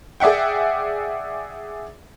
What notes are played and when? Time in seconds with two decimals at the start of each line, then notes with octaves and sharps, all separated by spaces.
0.20 G#4 D5 E5 F#5 G5